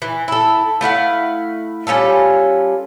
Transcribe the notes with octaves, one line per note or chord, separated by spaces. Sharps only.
E3
E4 A4
A3 E4 F5 F#5
G3 C#4 F4 A4